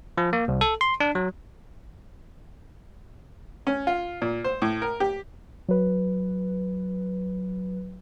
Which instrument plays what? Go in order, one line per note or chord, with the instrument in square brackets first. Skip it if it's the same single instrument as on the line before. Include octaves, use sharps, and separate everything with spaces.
[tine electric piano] F3
A#3
C2
A4
C6
D4
F#3
[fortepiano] C#4
F4
A#2
C5
A2
A#4
G4
[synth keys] F#3 B4